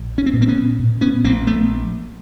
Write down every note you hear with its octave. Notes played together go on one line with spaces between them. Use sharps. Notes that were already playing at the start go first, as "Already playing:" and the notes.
Already playing: A#1
C#4
C4
A#2 B3
A#3 C4
B3 C#4
A#2
B3 C#4
A#1 A#3 C4
A3 B3